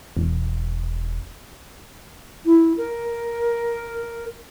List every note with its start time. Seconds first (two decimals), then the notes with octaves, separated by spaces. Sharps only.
0.17 E1
2.45 E4
2.77 A#4